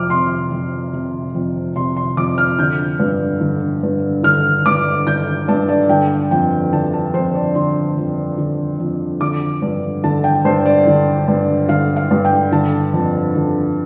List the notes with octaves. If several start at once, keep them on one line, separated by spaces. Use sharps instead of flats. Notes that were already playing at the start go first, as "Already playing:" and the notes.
Already playing: F2 C3 D6 F6
C3 C6
F2
C3
F2
C3 C6
C6
F2 D6
F6
D3 G6
G2
D3
G2
D3 F6
G2 D6
D3 G6
G2 A5
D5
D3 G5
F2 G5
D3 A5
A5
F2 C5
D5
D3 C6
F2
D3
F2
D3 D6
G2
D3 A5
G5
G2 C5
D5
D3
G2
D3 F5
F5
G2
G5
D3 A5
F2
D3